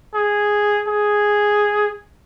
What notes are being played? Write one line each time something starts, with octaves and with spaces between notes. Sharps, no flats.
G#4
G#4